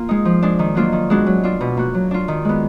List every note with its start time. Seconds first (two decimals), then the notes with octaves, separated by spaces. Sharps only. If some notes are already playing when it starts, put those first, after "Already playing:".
Already playing: A#3 F4
0.09 G#3 D#4
0.25 F3
0.42 G#3 D4
0.59 D#3
0.75 F#3 A#3 D4 F4
0.92 D#3
1.10 G#3 B3 D4 F#4
1.26 F#3
1.44 D4 F4
1.61 B2
1.77 A#3 D4 F#4
1.94 F#3
2.11 D4 F4
2.28 D#3
2.45 G#3 B3